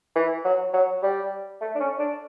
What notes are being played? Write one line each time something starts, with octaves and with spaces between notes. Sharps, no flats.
E3
F#3
F#3
G3
A3
D4
C#4
D4